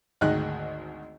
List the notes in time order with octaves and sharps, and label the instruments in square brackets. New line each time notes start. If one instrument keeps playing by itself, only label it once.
[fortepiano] G#1 D2 D#3 G#4 D#5 F#6